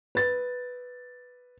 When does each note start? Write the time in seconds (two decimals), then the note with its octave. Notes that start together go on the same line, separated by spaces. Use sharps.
0.15 B4 A6